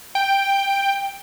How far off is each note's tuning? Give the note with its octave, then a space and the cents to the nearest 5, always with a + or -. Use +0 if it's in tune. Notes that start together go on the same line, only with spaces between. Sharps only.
G5 +5